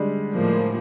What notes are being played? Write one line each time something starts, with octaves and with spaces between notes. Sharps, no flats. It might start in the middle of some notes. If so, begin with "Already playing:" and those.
Already playing: D3 G3 G#3
A2 F3 A#3